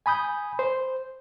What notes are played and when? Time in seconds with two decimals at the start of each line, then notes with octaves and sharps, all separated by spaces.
0.06 G#5 B5 D#6 G6
0.59 C5